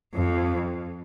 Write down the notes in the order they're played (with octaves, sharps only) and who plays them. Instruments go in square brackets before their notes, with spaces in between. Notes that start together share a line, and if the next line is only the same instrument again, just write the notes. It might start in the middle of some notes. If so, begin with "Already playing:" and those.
[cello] F2